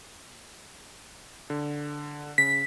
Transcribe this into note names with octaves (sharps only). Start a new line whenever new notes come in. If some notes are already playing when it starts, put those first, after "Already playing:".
D3
C#3 B6